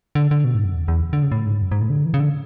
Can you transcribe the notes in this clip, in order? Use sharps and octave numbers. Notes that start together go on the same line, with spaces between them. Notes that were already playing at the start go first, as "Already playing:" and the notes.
D3
D3
B2
G#2
F#2
E2
E2
D3
C#3
A2
G#2
F#2
G#2
A2
D3
E3
C#3
D3